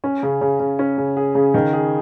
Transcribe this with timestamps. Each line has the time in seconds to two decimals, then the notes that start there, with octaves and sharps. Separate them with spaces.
0.04 C#4
0.23 C#3
0.41 C#3
0.60 C#3
0.79 C#4
0.98 C#3
1.17 G#4
1.35 C#3
1.54 D#3
1.73 G#4